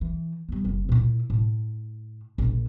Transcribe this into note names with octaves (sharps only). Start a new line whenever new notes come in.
E3
G3 B3
F#1
A#2 E4
A2
A#1 D3